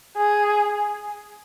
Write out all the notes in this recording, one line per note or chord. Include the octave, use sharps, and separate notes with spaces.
G#4